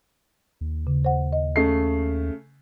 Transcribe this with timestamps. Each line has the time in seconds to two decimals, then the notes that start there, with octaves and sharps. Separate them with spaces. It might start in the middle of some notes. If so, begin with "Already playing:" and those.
0.61 D#2
0.87 C#3
1.05 C5 F#5
1.33 D#5
1.56 C#3 A3 C7